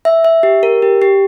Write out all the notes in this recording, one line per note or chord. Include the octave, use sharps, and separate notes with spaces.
E5
E5
G4
A#4
G4
G4